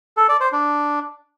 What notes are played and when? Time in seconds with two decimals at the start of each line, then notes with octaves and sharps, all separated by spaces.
0.17 A4
0.29 D5
0.41 C5
0.52 D4